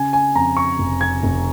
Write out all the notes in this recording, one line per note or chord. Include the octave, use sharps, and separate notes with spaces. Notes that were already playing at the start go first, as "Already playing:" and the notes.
Already playing: C#3 G#5
G#5
F2 A#5
C#6
F1
G#6
F1